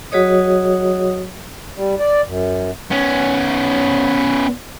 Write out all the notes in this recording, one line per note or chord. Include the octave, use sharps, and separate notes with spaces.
F#3 F#4 G#4 C#5 D#5 D#6
G3
D5
F#2
B3 C#4